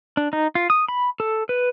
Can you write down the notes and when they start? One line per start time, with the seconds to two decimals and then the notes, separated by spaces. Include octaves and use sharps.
0.17 D4
0.33 D#4
0.55 F4
0.70 D#6
0.89 B5
1.20 A4
1.49 B4